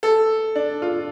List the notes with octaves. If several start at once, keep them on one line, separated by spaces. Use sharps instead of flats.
A4
D4
F4